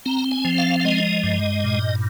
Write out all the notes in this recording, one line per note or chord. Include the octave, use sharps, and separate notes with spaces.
C4 A#5
G#5
F3
F5
F5
G#3 D#5
G2
A#2